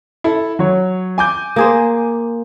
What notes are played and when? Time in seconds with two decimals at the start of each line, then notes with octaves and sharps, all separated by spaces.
0.24 E4 A4
0.59 F#3 C#5
1.18 G#5 D6 G6
1.56 A#3 G#4 C5